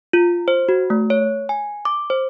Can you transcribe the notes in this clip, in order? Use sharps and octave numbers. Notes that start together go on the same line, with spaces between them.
F4
C5
F#4
A3
C#5
G#5
D6
C5